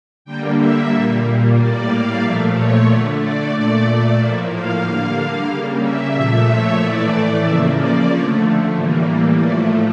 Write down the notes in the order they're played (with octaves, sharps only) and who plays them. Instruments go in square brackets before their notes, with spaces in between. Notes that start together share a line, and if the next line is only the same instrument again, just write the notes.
[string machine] D3 G3 A#3 G5
E5
A#2 G3 A#3
A2 G3 A#3 D5
F5
A#2 F3 A3 E5
C#5
D3 A3 D5
D5
A#2 A3 D5
D5
A2 F3 A#3 E5
F5
D3 G3 A#3 F5
C#3 G3 A#3
E5
A#2 F3 A3 E5
C#5
A2 E3 A3 D5
C#3 F3 A#3 E5
D5
D3 F3 A3 C#5
A2 E3 G3 A#3
A2 F3 A3 D5